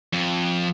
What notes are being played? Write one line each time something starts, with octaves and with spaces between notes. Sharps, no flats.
F2